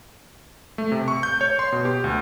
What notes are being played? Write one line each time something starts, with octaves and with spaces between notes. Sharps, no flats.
A3
C3
C#6
G6
C#5
C6
B2
G4
D2